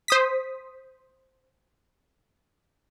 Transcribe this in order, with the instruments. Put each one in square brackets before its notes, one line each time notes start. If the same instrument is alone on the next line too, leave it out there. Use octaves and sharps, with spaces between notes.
[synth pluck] C5 D#6 B6